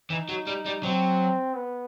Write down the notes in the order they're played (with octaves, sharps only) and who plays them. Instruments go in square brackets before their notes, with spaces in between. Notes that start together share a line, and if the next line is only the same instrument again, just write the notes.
[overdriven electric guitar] E3 [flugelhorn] D#4
[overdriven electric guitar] F#3
G3
G3
[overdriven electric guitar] F#3 [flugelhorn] C4
[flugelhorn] B3